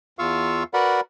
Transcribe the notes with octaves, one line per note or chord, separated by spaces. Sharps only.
E2 F4 F5 C#6 E6
F#4 A#4 B4 D5 F#5 B5